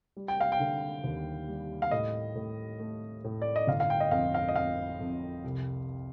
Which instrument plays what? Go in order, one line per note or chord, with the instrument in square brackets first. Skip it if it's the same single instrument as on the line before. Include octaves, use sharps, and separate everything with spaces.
[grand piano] G3
G5
F5
G5
D3
D#2
G3
F5
A2 D#5
A2
A3
A2
D5
D#5
G1 F5
F5
G5
D#5
F2 F5
F5
D#5
F2 F5
F2
C2